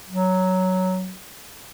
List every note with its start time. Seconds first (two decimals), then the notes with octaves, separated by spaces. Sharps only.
0.09 F#3